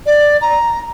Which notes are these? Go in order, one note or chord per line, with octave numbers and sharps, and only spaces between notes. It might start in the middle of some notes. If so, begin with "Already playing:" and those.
D5
A#5